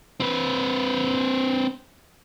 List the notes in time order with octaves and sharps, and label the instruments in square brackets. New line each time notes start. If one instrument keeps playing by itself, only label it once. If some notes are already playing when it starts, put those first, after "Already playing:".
[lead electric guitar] C4 B4